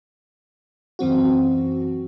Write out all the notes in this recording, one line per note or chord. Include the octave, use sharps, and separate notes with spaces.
F#2 E3 C4 F#4